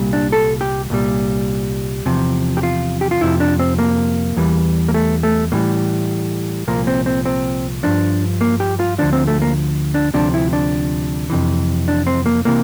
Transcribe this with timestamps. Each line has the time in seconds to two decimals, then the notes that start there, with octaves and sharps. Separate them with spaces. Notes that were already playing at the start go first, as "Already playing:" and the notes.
Already playing: C2 A#2 G3
0.13 D4
0.32 A4
0.61 G4
0.90 C2 A#2 G3
2.06 E2 C3 F3
2.57 G4
2.63 F4
3.01 G4
3.11 F4
3.21 F2 C3 F3 E4
3.40 D4
3.59 C4
3.79 A#3
4.36 E2 E3 G3
4.88 A#3
4.94 A3
5.23 A3
5.52 A2 E3 G3 A#3
6.68 C2 A#2 F3 A#3
6.87 C4
7.06 C4
7.25 C4
7.83 G2 F3 D4
8.41 A#3
8.60 G4
8.80 F4
8.98 D2 D3 F3 D4
9.13 C4
9.27 A3
9.42 A#3
9.94 D4
10.14 D2 C3 F3 D4
10.34 E4
10.53 D4
11.30 F2 C3 E3
11.88 D4
12.07 C4
12.26 A#3
12.45 C3 E3 A#3